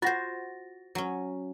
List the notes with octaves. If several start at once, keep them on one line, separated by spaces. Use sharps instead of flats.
F4 F#4 C5 F#5 A6 A#6
F#3 C#4